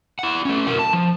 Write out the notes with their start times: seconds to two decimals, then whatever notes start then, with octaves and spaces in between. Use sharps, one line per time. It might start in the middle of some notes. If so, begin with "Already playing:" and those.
0.19 E4 F#5
0.45 A3 C#4
0.67 B2 F#3 A#4 F#5
0.79 A5
0.93 F3